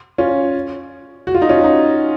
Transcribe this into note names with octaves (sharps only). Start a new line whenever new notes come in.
C#4 F4
F#4
F4
D#4
C#4 F4
D#4 F#4